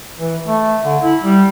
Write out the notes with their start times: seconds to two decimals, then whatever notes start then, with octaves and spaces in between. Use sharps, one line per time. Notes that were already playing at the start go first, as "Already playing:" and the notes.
0.18 E3
0.47 A3
0.85 D3
1.03 E4
1.23 G3